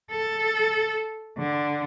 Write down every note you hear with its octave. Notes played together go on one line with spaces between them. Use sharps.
A4
D3